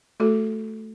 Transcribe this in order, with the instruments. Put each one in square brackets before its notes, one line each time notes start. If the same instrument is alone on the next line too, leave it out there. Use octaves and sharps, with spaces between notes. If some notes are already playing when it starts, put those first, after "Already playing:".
[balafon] A3 F#4 A4